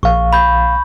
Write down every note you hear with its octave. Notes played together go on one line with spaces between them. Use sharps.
A#1 F5 C#6
B5 G6